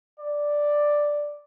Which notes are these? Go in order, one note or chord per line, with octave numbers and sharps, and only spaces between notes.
D5